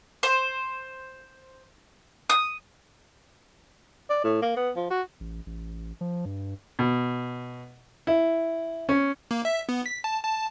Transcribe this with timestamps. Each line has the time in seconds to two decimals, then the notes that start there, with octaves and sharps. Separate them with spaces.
0.23 C5
2.30 D#6
4.10 D5
4.24 A2
4.42 A#3
4.56 B3
4.76 F3
4.90 F#4
5.20 A1
5.46 A1
6.01 F3
6.25 G2
6.79 B2
8.07 E4
8.89 C#4
9.31 A#3
9.45 E5
9.69 B3
9.86 B6
10.04 A5
10.24 A5